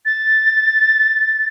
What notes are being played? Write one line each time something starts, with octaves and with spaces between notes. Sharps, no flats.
A6